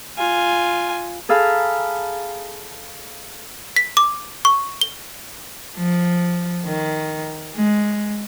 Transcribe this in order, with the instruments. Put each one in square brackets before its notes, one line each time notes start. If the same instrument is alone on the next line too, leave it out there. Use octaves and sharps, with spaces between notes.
[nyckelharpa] F4 G#5
[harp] G#4 A4 F5 A#5 B5
[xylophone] B6
D6
C#6
G7
[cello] F3
D#3
G#3